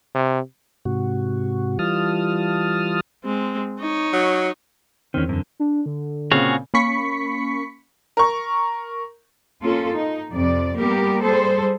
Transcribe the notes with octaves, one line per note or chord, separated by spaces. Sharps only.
C3
G#2 C3 F#4
E3 G3 F4 A5 D#6 F6
G#3 C4
D#4 C#5
F#3
E2 D#3 C4 C#4
F#2 D3
D4
D3
A#2 C#3 C4 F#4 G#4 F5
A#3 C#4 B5 C#6 B6 C#7
A#4 C#6
A#3 C#4 F4 A4
D#4
F2 C3 D5
G3 A#3 B3 G4 A#4
G3 G#4 A4 C5